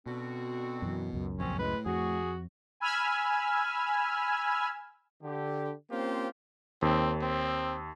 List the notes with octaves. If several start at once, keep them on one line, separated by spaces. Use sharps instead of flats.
B2 D3 C4 F#4
F#2 E3
C#2 F#2
A#1 F2 C4 C#4
A2 G#3 B4
F2 F#4 G#4
G#5 B5 E6 F6 G#6
D3 G4
A#3 C4 C#4 F4 G4 C5
D#2 C4
C4